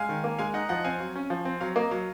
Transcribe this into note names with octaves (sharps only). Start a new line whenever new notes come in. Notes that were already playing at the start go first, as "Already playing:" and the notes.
Already playing: G#3 F5 G#5
D#3
A#3
G#3 F5 G#5
D#4 D#5 F#5
F3 D#5 F#5
C4 F5 G#5
F#3
C#4
F3
C4
F#3 F5
A#3 D#5
F#3 F5